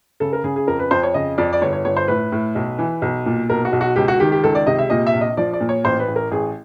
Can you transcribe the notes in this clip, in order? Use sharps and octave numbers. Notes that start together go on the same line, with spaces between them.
C#3 A4
A#4
C#3 G#4
G#4
F2 A#4
B4
F2 C5
C#5
C#3 D#5
F2 D5
D5
G1 C#5
C#5
G1 C#5
C5
A2 B4
A2
B1
E3
B1
A#2
B1 A#4
F#4
B1
F#4
C#2 G4
F#4
D#3 G4
G4
C#2 A4
D5
C3 D#5
E5
A#2 D#5
E5
A#1
D#5
F3 D5
D5
A#2
C#5
A1 C5
B4
A1
A#4
A1 G#4